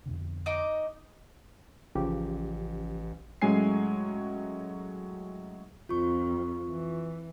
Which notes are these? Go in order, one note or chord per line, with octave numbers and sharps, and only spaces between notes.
F2 B2 D3
D#4 D#5 D6
A1 C#3 F3 G4
A2 F#3 G#3 C#4 G#5 C7
F2 F4 C#6
E3